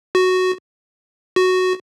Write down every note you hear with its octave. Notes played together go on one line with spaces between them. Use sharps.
F#4
F#4